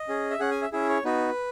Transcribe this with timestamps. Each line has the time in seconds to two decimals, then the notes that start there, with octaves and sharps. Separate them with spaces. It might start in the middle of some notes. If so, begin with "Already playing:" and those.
Already playing: D#5
0.08 C#4 G#4
0.31 E5
0.40 C#4 G#4 F#5
0.51 G#5
0.62 E5
0.72 C#4 E4 G#4 E5
0.89 C#5
1.04 B3 D#4 F#4 B4